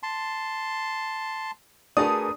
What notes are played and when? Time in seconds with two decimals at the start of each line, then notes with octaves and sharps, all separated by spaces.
0.03 A5 C6
1.97 A3 D4 F#4 G#4 A#4 B4 D#6